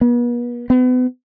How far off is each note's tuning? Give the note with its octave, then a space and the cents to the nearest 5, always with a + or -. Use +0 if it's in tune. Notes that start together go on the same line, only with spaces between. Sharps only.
B3 -40
B3 +35